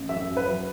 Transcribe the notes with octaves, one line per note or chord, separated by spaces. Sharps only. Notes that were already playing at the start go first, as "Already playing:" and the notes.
Already playing: A1
F#2 E5
F#2
B4
F#3